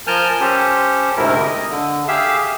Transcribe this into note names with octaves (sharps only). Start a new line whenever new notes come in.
F3 A#4 G#5 A5 F6 G6
C#4 G4 A4 C5
D2 G#2 C3 E4 A#4
D#5
D3
G4 G#4 E5 F5 E6